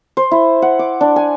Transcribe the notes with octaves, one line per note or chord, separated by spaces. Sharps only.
C5
E4
F#5
D6
D4
G#5